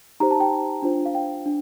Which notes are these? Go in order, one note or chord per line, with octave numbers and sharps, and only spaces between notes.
D#4 G4 C5 A#5
A5
G5
D4 F4 C5
F5
G5
D4